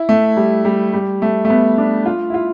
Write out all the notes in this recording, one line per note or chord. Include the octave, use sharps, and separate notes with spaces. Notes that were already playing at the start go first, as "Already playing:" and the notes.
Already playing: E4
A3
G3
G3
G3
A3
A3
B3
D4
F4
E4
F4